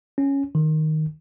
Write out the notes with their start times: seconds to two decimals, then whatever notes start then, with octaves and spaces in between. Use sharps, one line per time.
0.18 C#4
0.55 D#3